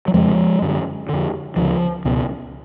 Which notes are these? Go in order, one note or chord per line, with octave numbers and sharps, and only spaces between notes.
F#3
F2 C#3 F3 G#3
F#2 D3
F2 D3
D2 C#3 F3
C#2 B2